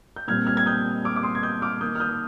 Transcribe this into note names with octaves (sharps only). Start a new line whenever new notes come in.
G6
A#2 G3 C4 F6 G#6
F6 G#6
G#6
D#6 G6
D6 F6
D6
C6 D#6
G#6
D#6 G6
D6 F6
D#3 A#3 D#6 G6
F6
D#6 G6